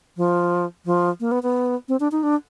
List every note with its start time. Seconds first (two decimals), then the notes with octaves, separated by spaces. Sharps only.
0.17 F3
0.86 F3
1.20 A#3
1.32 B3
1.43 B3
1.88 C4
2.00 D4
2.12 D#4
2.23 D4